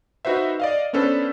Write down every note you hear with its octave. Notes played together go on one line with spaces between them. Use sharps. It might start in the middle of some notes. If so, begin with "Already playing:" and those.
D#4 F#4 B4 C5 E5
D5 D#5 F5
B3 C#4 D4 A4 B4 C5